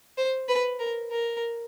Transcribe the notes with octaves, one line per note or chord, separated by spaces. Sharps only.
C5
B4
A#4
A#4